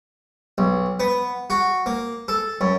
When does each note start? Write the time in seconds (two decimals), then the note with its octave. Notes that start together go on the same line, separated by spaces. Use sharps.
0.58 B1
1.00 B3
1.50 F#4
1.86 A#3
2.28 A4
2.61 F#2